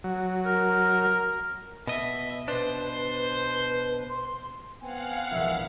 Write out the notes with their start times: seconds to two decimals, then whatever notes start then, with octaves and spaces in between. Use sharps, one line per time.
0.04 F#3
0.46 A#4
1.87 B2 D#5 E5
2.48 B2 D4 B4 C5
4.09 C6
4.82 B3 C4 F5 F#5 G#5
5.31 E1 A#1 E5